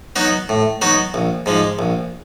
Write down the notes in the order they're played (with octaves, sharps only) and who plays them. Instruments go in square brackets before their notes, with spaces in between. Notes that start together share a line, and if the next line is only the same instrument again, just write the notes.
[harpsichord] F#3 B3 D#4 F#4
A2
F#3 B3 D#4 F#4
A#1
G#2 F3 G#3
A#1